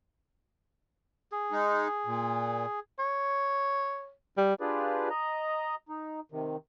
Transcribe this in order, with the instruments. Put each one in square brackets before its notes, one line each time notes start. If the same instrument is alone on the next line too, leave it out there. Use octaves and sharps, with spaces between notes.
[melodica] G#4
[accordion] G#3 D#4
A#2
[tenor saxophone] C#5
G3
[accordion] D4 F4 G4 G#4 B4 D5
D#5 A#5
D#4
C3 D#3